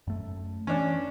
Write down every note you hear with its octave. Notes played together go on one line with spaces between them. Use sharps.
F#2 A3
E3 C#4 D4